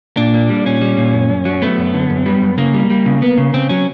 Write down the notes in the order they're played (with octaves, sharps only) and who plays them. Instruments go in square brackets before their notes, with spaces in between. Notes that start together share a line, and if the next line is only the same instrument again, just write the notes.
[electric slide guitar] A#2 [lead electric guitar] D4
[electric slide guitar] A#3
G3
[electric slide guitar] A#2 [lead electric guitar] C#4
[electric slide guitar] G3
A#2
F#2
F#2
F#3
[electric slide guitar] A3 [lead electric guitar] B3
[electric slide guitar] F#2
D3
F#2
G3
F#2
[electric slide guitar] C#3 [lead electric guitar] A#3
[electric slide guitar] G3
G3
C#3
B3
C#3
[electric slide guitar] C#3 [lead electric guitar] C4
[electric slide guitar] F#3 [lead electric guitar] C#4